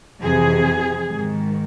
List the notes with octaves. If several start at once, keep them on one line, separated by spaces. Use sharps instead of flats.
F2 C3 E3 G#4
G#2 D#3